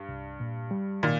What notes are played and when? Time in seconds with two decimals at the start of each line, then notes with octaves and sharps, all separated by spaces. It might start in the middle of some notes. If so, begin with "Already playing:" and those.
Already playing: G2
0.09 C2
0.40 A#2
0.71 G3
1.03 A#2 D#3